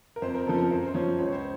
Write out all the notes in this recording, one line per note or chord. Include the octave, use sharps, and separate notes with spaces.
A#4
F2 C5
A#4
C#3 F3 A4
A#4
F#2 C5
C5
F3 C#5
C#2 C#5
C5